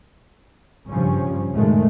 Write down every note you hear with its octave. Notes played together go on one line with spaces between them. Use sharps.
G2 C#3 F3 G3 C#4
F#2 A#2 D#3 G#3 A3